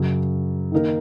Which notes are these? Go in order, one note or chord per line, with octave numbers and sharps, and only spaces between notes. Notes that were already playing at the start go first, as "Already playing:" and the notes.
Already playing: F#2 C#3 F#3
D#3 A#3 D#4 A#4